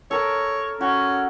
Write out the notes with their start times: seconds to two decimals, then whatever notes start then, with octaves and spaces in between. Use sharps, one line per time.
0.11 A4 A#4 C#5
0.81 C#4 F#4